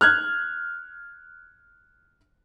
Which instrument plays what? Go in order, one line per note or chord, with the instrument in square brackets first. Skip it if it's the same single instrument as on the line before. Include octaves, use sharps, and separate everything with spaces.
[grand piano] F6 F#6 G#6